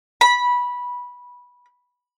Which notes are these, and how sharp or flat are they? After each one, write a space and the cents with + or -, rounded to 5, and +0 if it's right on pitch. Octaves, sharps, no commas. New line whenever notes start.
B5 -15